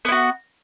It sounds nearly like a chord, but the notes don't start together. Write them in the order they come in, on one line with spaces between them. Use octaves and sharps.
B3 E4 F#4